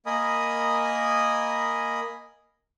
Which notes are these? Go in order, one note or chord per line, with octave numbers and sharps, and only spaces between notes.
A#3 A#4 D#5 G#5 B5 D#6